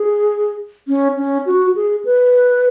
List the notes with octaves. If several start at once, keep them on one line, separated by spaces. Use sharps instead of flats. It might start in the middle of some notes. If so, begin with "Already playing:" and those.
Already playing: G#4
C#4
C#4
F#4
G#4
B4